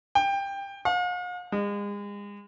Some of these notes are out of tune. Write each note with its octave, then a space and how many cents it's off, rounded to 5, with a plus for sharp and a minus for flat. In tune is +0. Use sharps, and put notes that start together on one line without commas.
G5 +15
F5 +45
G#3 -35